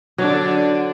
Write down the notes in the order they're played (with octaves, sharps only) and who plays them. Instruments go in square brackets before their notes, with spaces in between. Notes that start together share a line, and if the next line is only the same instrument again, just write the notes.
[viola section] D3 D4 [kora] F#3